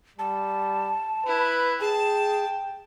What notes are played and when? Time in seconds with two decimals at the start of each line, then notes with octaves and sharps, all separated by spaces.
0.19 G3 A5
1.27 E4 B4
1.81 G#4 G5 A5